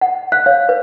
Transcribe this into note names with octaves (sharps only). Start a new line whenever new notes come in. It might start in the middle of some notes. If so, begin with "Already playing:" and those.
F#5
F5 F#6
C#5 F5
B4